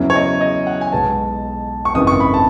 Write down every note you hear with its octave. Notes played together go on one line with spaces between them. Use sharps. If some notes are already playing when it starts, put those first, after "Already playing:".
Already playing: E2 C#3 F#3 C#4 E4
C#5
D#5
D#5
F#5
G#5
B1 B2 G#3 B3 A5
C#6
G#1 F#2 C#3 E3 B3 D#6
C#6
B5
A5